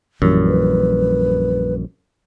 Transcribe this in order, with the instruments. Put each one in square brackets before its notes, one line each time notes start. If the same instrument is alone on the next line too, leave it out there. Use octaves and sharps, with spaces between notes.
[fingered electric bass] A#1 E3 G3 [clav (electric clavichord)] F#2
[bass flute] B4